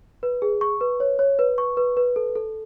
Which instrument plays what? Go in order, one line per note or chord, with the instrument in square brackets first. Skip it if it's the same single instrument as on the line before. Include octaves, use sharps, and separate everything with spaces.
[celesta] B4
G#4
C#6
B4
C#5
C#5
B4
C#6
B4
B4
A4
A4